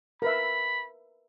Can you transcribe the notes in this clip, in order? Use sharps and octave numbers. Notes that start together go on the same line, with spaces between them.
A#4 B4 E5 B5